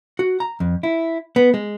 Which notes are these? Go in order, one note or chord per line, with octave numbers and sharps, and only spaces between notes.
F#4
A#5
F2
E4
B3
G#3